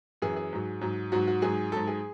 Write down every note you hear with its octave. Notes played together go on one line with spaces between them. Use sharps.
F#2 E3 G#4
G#4
G#2 F#3
G#2 F#3
G#2 F#3 F#4
F#4
G#2 F#3 G#4
G#2 F#3 A4
G#4